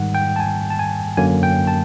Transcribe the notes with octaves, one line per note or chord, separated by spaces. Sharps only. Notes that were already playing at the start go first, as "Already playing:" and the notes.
Already playing: G#2 D#3 G3 F#5
G5
A5
G#5
A5
G#5
F#2 D3 F#3 A#3 G#5
G5
A5